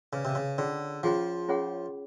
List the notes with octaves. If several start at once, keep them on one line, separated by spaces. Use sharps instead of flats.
C#3 G#4 B4 D5 F5
C3
C#3
D3 C#4 F4 G#4 C#5 F#5
F3 C#4 F4 G#4 C#5 F#5
C#4 F4 G#4 C#5 F#5